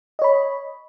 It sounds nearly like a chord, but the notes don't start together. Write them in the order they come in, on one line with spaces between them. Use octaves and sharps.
D#5 C#5 B5